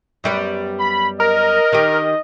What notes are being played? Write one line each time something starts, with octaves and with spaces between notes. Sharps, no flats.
F#2 G3 B3
B5
A#4 D#5
D#3 G4